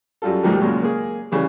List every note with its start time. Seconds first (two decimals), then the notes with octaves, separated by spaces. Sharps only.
0.22 F#2 G3 F4 A4
0.43 D#2 G#2 B2 D#3 F3 G3
0.61 F#2 A#2 C#3 G#3
0.82 A#3 G#4
1.32 C#3 E3 G3